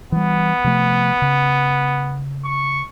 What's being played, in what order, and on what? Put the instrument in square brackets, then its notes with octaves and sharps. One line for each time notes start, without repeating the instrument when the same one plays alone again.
[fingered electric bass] E3 G3 [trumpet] B3
[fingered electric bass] C3 F3 A3
C#3
[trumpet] C#6